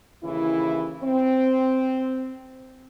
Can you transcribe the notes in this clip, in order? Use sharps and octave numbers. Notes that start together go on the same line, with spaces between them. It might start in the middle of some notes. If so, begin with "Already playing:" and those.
D#2 C#3 E3 E4
C4